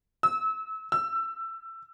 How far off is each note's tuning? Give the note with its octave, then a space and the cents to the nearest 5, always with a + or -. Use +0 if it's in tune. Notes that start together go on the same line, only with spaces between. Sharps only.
E6 -30
E6 +20